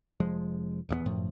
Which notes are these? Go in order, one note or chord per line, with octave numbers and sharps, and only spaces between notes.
F1 F3 G#3
D#1 E2 F3 B3
G1 F#2 A2 F3